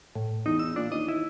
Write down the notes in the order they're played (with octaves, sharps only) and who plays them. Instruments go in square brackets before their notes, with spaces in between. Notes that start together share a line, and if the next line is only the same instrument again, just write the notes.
[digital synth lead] A2
[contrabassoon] E2 [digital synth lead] D#4
[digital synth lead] E6
[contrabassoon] A#2 [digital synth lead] D4
[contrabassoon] D#2 [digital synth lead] D#5
[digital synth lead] E4